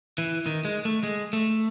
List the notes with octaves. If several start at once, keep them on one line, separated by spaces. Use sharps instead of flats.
E3
D#3
G#3
A3
G#3
A3